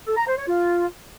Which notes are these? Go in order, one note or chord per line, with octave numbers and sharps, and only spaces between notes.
A4
A#5
C5
C#5
F4